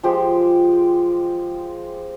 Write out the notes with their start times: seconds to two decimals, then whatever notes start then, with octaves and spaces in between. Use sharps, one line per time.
0.03 F3 G#3 G4